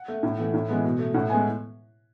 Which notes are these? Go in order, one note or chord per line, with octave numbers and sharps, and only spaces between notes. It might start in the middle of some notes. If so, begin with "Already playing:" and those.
Already playing: F#5
A3
A2
E3 A3
A2
E3 G#3 B3
B2
A3
A2 F#5
G#3 B3 G#5